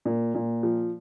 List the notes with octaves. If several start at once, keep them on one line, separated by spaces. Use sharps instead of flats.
A#2
A#2
F3